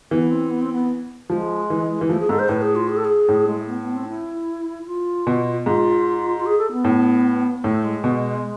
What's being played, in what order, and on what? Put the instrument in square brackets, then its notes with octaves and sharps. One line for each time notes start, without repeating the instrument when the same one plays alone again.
[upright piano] E3 [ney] B3
[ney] C4
B3
C4
B3
[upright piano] F3 [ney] G#3
[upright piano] E3
E3
[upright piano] F3 [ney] A3
[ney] G#4
[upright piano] G#2 [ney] A4
[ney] C5
[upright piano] A2 [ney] B4
[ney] G#4
F4
G#4
A4
G#4
[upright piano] A2
[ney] G#3
A3
B3
B3
C4
E4
F4
[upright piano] B2
[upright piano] G#2 [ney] F4
[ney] F4
G#4
A4
B3
[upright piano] A2
[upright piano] A2 [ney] A3
[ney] G#3
[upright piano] B2